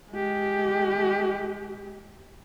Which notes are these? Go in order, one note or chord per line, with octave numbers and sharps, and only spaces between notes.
G#3 G4